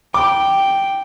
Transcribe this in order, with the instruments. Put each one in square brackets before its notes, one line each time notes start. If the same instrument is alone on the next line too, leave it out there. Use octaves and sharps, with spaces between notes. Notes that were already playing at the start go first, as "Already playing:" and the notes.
[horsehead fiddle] G5 [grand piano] D6